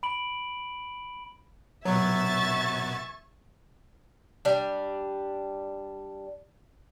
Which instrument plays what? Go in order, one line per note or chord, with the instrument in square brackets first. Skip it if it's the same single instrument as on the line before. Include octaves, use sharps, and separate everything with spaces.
[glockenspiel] B5 D7 F#7
[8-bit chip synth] B2 B3 [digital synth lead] F#3 [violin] E5 A6 [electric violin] G#5 C#6
[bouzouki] G3 D4